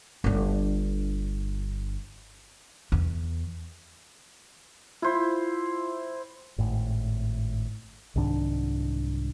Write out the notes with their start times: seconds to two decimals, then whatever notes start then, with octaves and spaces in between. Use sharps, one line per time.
0.24 G1 D4
2.92 E2
5.02 E4 F4 C5
6.58 G#1 A2
8.16 C2 G#2 D#3 D4